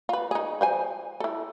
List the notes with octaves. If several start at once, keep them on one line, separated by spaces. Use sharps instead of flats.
F4 B4
D#4 G#4
F3 C5 G#5
E4 A4